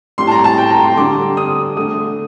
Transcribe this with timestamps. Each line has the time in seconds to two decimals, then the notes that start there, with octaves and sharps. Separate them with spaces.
0.18 A2 G3 C6
0.27 A5
0.32 A#5
0.44 A5
0.58 G5
0.70 A#5
0.84 C6
0.97 D3 G3 D6
1.37 D#6
1.76 D3 A3 D#6